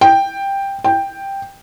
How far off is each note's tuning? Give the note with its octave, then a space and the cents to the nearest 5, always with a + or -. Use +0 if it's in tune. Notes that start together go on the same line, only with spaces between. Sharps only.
G5 +5
G5 +5